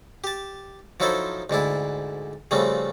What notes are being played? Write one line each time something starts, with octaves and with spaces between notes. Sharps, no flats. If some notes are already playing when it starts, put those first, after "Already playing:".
G4 A5
F3 F#3 D#4 E4 A4 C5
D2 G#2 D4 E4
C#3 F3 G3 A3 C4